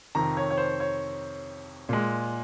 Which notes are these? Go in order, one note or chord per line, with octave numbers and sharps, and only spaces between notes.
F2 C3 D#3 A#5
C#5
C#5
C5
C#5
A#2 G#3